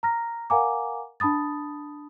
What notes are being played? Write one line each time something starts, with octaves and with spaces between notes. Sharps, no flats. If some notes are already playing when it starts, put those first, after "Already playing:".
A#5 F6 A#6
A#4 F5 F#5 G#5 A#5 D6
D4 A5 B5 D#6 A6